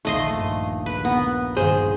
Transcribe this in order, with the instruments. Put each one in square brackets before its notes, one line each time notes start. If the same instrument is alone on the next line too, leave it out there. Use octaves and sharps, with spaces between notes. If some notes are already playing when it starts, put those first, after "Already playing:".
[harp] A#1 D#2 D#3 [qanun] A3 D#5 C6
[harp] G2
[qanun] B4
[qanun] B3 [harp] A#4 A#5
[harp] G2 D#3 [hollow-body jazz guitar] G#4 C5